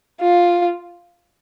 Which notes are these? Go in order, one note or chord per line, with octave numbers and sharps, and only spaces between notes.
F4